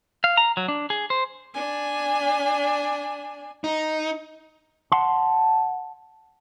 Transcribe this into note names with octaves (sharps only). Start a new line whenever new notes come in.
F5
A#5
F#3
D4
G#4
C5
D4 G#5
D#4
F#5 A5 C6